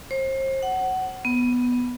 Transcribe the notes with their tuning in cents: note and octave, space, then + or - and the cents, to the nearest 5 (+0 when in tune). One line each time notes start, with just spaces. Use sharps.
C5 +35
F#5 +20
B3 -5